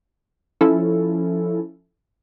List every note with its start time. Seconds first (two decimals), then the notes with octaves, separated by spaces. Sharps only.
0.61 F3 C#4 E4 A4